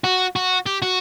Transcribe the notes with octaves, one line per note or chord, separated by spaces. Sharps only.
F#4
F#4
G4
F#4